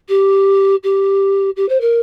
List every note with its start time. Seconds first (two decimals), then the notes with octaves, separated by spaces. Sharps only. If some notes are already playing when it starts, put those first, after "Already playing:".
0.08 G4
0.83 G4
1.56 G4
1.68 C5
1.81 A#4